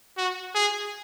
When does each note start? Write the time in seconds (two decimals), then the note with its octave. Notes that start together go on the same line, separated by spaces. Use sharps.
0.17 F#4
0.55 G#4